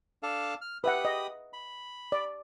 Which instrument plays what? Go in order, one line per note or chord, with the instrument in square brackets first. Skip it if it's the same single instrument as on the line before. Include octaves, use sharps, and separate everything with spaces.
[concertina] D4 A4 F5
F6
[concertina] G4 B5 D#6 [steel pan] B4 E5 F#5
[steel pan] D#5
[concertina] B5
[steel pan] D5